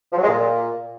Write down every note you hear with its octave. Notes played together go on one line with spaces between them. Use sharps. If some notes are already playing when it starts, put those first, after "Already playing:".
F3
F#3
G#3
A#2